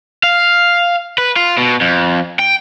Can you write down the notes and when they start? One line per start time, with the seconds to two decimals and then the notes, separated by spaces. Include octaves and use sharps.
0.23 F5
1.18 B4
1.36 F4
1.58 B2
1.81 F2
2.39 G5